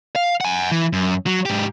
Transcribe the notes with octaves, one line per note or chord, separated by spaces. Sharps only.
F5
F#5 G#5
E3
F#2
F#3
G#2 G4